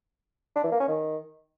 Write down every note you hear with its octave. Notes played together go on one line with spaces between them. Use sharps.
D4
E3
A#3
C#4
D#3